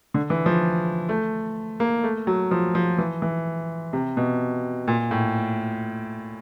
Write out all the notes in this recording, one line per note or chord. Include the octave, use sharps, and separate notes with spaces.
D3
E3
F3
A3
A#3
A3
F#3
F3
F3
E3
E3
C3
B2
A#2
A2